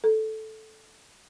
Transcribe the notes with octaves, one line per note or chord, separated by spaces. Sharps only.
A4